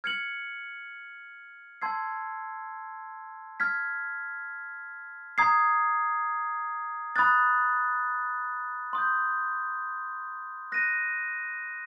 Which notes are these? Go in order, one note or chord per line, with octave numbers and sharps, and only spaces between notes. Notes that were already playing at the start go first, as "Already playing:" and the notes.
F6 G#6 C#7 F#7
A5 C6 E6 G#6 C7
F6 G#6 B6
A#5 D#6 G#6 C7
B5 D#6 F#6 A6
C6 D#6 G6
F#6 A#6 D#7